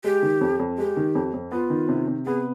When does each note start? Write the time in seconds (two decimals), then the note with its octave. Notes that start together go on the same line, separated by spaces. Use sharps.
0.04 G#3 G4
0.23 D#3
0.41 F2
0.60 F2
0.78 G#3 G4
0.97 D#3
1.15 F2
1.34 F2
1.52 B3 F4
1.70 D#3
1.89 C3
2.08 C3
2.26 B3 G#4